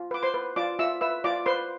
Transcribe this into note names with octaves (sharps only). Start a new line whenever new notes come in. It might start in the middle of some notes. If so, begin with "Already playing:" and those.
Already playing: F4
B4 D6
C5 C6
B4
F4 D5 D6
F4 E5 E6
B4 E5 E6
F4 D5 D6
B4 C5 C6